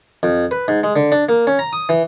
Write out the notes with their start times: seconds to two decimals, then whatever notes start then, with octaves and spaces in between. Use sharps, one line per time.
0.23 F2
0.51 B4
0.68 G#2
0.83 G#3
0.96 D3
1.12 D4
1.29 A#3
1.47 C#4
1.59 A#5
1.73 D#6
1.89 E3